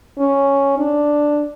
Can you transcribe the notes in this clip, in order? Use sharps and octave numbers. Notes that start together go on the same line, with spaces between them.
C#4
D4